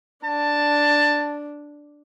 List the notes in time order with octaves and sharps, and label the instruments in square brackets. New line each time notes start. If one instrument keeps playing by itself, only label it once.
[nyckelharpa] D4 [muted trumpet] A5